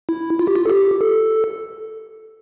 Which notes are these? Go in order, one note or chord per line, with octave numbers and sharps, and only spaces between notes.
E4
F4
G4
F4
A4
G4
A4